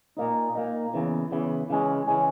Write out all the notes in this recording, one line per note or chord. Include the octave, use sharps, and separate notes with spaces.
A#2 A#3 D#4
A#2 A#3 D#4
E2 C#3 E3
E2 C#3 E3
C#3 E3 G#3 C#4
C#3 E3 G#3 C#4